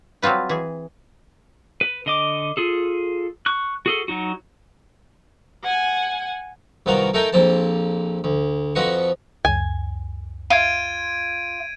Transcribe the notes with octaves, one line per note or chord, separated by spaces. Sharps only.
F#3 G3 C4 F4 B4
E3 G#4
B4
D3 D#5 D6
F4 G#4 A4
C#6 F#6
F#4 G#4 A4
F#3 D#4 F#4
F#5 G#5
C2 D#3 B3 F4 F#4 A#4
A3 D#4 A4 A#4 G5 G#5
A#1 F2 A#3 C5 A5
D2
F2 F3 F#4 B4 D#5 C#6
C#2 F#2 G#5
F4 G#6 D7 D#7